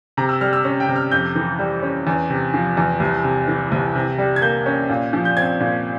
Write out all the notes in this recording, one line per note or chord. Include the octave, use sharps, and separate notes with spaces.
C3 A#5
E6
G3 F6
E6
C#4
G5
C3
F6
F2 G6
E3
G3
C#4
E2
C3
F3
E2
C2
C3
E3
C2
C3
G3
G#6
A#3 G6
C#4
A#2
F3
G6
C4 G#6
A#2